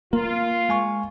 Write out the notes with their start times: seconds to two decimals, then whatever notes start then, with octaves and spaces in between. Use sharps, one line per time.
0.13 A#3 F4 A#4
0.69 G#3 G#5 C#6